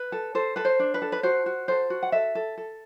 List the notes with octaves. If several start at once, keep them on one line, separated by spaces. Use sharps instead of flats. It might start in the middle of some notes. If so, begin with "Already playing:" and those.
Already playing: B4
A4
A4 C5
A4 B4
C5
D4
B4
A4
B4
F#4 C5
F#4
A4 C5
F#4
F#5
A4 E5
A4
A4